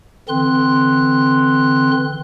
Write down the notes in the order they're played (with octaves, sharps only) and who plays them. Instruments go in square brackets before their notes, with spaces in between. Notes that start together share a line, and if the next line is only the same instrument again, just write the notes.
[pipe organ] D3 E3 C4 C6 F#6